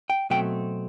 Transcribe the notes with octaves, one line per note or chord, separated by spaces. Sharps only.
G5
B2 F#3 A3 C4 G5